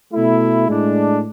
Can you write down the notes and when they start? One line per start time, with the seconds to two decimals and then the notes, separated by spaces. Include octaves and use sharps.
0.12 B2 A3 E4
0.67 A2 G#3 D4